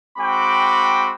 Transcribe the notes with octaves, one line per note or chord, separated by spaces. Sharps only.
G#3 C4 F#4 G5 B5 D6